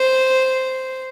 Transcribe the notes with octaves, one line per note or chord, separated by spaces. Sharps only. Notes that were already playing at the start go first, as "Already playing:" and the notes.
Already playing: C5